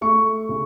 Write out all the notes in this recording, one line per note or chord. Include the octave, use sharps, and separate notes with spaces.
A3 C#6
C#3